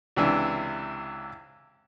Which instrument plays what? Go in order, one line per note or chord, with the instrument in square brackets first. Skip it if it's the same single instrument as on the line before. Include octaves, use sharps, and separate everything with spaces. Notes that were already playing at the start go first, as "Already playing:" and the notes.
[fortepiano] C#2 C3 E3 D4